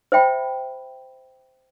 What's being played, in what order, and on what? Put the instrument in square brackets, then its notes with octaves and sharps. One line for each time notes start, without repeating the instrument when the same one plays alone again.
[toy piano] C5 E5 G5 B5